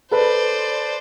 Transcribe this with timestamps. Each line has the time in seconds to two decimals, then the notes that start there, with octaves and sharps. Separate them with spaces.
0.11 A4 B4 C5 D5